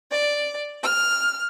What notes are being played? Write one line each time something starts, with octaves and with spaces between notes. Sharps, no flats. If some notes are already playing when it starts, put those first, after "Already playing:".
D5
F6